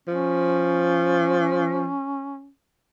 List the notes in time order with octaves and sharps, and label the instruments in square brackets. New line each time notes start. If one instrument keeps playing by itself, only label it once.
[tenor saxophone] F3 [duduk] C#4